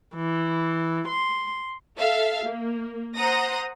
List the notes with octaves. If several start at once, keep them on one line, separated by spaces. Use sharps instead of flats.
E3
C6
A4 E5 F5
A#3
C5 F#5 A#5 D#6 A#6